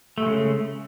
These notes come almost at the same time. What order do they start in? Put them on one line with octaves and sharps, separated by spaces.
A3 G#3 C#3